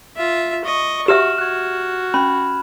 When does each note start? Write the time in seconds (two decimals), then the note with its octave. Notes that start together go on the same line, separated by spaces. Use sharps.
0.17 F4 E5
0.65 D#5 C#6
1.08 F#4 G4 E5 F6 E7
1.38 F#4 F#6 G#6
2.14 C#4 B5